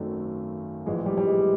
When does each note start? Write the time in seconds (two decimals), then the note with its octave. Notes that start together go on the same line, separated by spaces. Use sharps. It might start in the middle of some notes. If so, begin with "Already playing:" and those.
Already playing: G#1 F#2 D#3 F#3 A3
0.86 A#1 A2 E3 G#3
1.06 G3
1.17 G3
1.27 G#3